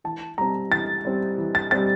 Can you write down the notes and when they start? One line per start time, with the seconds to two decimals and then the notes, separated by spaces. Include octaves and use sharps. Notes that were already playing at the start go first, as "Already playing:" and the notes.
0.04 E3 A5
0.38 G3 C4 A#5
0.71 E3 A6
1.05 G3 C4
1.38 E3
1.55 A6
1.71 G3 C4 A6